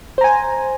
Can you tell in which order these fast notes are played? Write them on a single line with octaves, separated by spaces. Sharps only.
C5 A#5 G#5